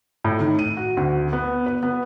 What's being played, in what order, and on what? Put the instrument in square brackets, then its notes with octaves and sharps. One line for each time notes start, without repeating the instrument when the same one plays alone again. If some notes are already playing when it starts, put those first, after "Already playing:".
[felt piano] A2
D#3
D#7
F#4
D2
B3
B4
B3